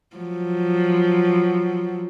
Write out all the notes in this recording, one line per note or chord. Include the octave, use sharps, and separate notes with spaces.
F3 F#3